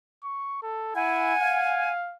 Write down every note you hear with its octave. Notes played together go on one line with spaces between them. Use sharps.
C#6
A4
E4 F#5 G#5
F5